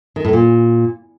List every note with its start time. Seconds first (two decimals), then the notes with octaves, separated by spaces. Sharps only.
0.16 D#3
0.25 A2
0.33 A#2